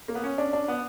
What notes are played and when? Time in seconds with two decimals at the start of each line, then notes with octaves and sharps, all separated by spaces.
0.08 A#3
0.15 B3
0.24 C#4
0.38 D4
0.53 D4
0.68 B3